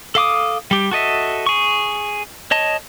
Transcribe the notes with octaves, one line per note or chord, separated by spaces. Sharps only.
A4 F5 D6 D#6
G3 G4
F#4 A4 D#5 E5
G#4 C#6
C#5 D#5 A5